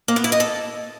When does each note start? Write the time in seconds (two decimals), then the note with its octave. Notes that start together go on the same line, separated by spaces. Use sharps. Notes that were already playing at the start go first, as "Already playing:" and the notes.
0.08 A#3
0.16 B3
0.24 E4
0.32 D#5
0.40 A4